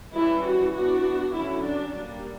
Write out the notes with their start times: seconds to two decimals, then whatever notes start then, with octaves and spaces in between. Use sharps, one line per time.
0.14 E3 G3 C#4 E4
0.44 F#4
0.74 E3 B3 D4 F#4
1.34 D3 F#3 C#4 E4
1.63 D4
1.92 G3 A#3 D4